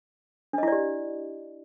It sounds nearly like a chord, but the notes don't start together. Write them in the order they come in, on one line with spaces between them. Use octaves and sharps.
D4 D#5 E4 D5 G4